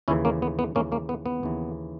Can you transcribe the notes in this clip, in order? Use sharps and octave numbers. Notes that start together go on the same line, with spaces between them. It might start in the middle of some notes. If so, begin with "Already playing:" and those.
D#2 C#3 E3 C#4 E4
A#3 C#4
B3
B3
D#2 C#3 E3 A#3 C#4
A#3 C#4
B3
B3
D#2 C#3 E3